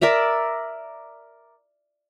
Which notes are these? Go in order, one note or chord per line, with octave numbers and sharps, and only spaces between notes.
A#4 D5 E5 A#5